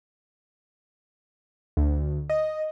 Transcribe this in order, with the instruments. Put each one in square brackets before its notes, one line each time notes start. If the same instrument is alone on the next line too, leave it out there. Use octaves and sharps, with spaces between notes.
[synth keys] D2
D#5